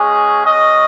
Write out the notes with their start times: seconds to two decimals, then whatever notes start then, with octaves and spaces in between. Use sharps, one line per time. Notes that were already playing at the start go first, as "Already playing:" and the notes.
Already playing: G#3 C#4 F#4 G#4
0.45 D#5